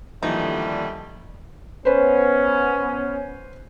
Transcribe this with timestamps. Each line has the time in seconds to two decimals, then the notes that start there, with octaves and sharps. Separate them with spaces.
0.23 D#2 D3 E3 F3 G3 A3 D#4
1.85 B3 C#4 B4 C5